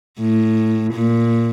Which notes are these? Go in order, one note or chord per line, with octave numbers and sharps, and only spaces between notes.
A2
A#2